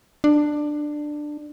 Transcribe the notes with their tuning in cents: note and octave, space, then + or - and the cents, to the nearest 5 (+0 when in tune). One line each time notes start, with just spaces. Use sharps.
D4 +15